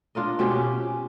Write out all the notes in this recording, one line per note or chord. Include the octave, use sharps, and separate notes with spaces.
D4 F4 A#4 D#5
B2 C4 C#4 G4
C#4